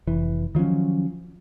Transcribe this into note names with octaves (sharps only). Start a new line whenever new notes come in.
F1 E3
D#3 F3 F#3 C#4